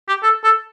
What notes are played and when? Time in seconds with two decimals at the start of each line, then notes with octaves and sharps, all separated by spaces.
0.08 G4
0.23 A4
0.44 A4